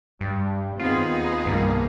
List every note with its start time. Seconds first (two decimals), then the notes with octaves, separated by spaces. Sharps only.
0.21 G2 G3
0.79 D#2 B3 C4 D#4 F4 G#4
1.46 C2 G2 D#3 A#3